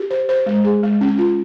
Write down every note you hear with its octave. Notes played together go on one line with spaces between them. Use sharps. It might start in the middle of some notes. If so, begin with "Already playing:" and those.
Already playing: G4
C5
C5
G#3
G#4
G#3
C#4
F4